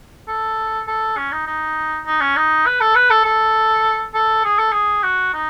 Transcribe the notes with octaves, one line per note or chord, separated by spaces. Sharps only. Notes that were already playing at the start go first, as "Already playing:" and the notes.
A4
A4
C#4
D#4
D#4
D#4
C#4
D#4
B4
A4
B4
A4
A4
A4
G#4
A4
G#4
F#4
D#4